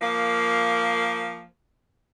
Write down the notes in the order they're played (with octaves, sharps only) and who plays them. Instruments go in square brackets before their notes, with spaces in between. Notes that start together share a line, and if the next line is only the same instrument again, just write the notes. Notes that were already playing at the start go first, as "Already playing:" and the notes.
[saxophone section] F3 A#3